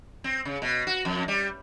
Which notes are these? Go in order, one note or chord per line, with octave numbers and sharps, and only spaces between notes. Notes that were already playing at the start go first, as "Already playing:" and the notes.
C4
C#3
B2
F#4
F2
G3